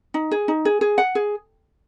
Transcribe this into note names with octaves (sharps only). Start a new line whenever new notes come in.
D#4
G#4
D#4
G#4
G#4
F#5
G#4